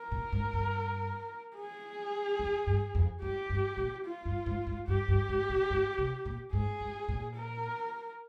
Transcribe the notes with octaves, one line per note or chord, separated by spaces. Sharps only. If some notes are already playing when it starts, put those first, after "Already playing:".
Already playing: A#4
A#2
G#2
G2
G#4
F2
G2
F2
G2 G4
G2
A#2
F4
G2
G#2
G#2
G2 G4
G2
G#2
A#2
G#2
C3
A#2
G#2 G#4
G#2
A#2
A#4